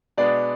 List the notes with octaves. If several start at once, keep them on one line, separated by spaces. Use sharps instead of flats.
B2 G#3 B3 D4 D5